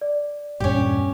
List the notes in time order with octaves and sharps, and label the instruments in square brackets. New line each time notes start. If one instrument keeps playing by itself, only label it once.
[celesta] D5
[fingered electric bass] E2 G2 A#2 [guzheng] C#4 G4